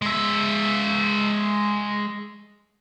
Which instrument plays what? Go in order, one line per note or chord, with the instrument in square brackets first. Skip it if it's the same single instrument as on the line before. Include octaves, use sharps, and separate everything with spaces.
[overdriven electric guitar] G#3 E5